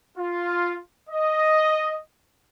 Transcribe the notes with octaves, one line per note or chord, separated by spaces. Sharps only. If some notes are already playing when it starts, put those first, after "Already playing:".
F4
D#5